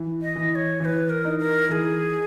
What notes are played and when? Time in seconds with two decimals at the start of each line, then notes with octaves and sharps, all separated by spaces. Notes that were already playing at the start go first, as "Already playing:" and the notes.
Already playing: E3
0.22 D#5
0.36 E3
0.51 D#5
0.55 C#5
0.80 E3 C#5
0.85 B4
1.10 A#4
1.25 D#4
1.39 A#4
1.68 E3 G#4 A#4